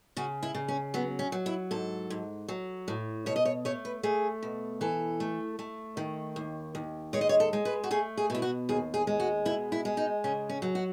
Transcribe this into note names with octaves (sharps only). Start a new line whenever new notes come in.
C#3 F#4
E4
C#3
C#4
F#3 B3
C#4
F#3
E4
G#2 A4
G#2
F#3
A2
B2 C#5
D#5
C#5
A3 C#5
B4
A3 G#4
B2
E3 A4
A3
A3
D#3
D#2
D#2
G#3 C#5
D#5
C#5
A4
G#3
B4
F#4
A3 G#4
G#4
B2 E4
F#4
D#2 G#4
G#4
G#3
F#4
B2 E4
E4
G#3
D#4
C#3 C#4
C#4
F#3
F#4